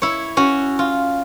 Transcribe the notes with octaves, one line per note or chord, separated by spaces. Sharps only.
E4 C#5
C#4 F#4
F4